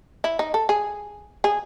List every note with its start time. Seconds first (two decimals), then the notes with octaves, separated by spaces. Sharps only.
0.24 E4
0.39 D#4
0.54 A4
0.69 G#4
1.44 G#4